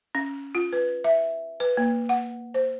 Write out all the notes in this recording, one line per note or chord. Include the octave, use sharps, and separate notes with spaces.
C#4
F4
B4
E5
B4
A#3
F#5
C5